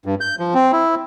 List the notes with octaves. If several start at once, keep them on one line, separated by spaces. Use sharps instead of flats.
G2
G6
F3
C4
E4